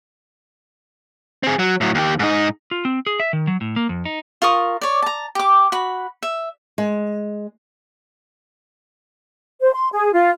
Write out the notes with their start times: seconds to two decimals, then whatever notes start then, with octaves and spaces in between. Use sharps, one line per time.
1.43 C4 G#4
1.59 F#3
1.81 A2 F#3
1.95 D#2 G4
2.19 G#2 D#4
2.71 F4
2.85 C4
3.06 G#4
3.20 E5
3.33 D#3
3.47 F#3
3.61 A2
3.76 A#3
3.89 F2
4.05 D#4
4.42 F4 A#4 C#6 D#6
4.81 C#5 D5
5.02 A5 A#5
5.35 G4 D6
5.72 F#4 B5
6.23 E5
6.78 G#3
9.62 C5
9.74 C6
9.92 G#4
10.13 F4